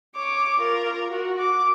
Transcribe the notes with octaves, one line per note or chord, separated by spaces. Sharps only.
C#5 D6
F4 A#4
F#4
D6